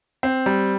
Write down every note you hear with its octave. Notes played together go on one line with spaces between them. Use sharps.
C4
G3